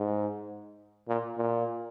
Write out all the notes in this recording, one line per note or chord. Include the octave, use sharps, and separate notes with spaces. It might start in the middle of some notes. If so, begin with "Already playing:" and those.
Already playing: G#2
A#2
A#2